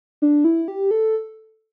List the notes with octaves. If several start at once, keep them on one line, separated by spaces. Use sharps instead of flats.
D4
E4
G4
A4